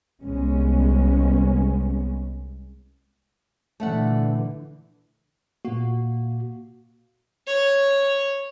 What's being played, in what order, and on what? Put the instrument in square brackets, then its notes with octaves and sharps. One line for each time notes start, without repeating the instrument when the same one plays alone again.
[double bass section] C2 G#3 B3 C#4
[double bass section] A#2 D3 E3 [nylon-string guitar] A3 E5 F#5
[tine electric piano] A#2 F#4 [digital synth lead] A#3
[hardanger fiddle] C#5